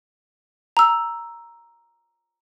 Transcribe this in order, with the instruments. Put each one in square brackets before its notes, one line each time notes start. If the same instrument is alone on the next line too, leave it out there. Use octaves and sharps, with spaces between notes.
[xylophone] A#5 E6